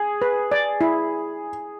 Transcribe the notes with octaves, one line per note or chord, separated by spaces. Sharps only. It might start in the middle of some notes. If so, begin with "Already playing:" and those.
Already playing: G#4
B4
D5
E4